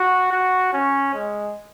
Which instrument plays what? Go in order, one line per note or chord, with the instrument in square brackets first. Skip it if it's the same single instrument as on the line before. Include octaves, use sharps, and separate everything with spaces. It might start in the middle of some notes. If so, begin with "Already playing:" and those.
Already playing: [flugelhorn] F#4
F#4
C#4
G#3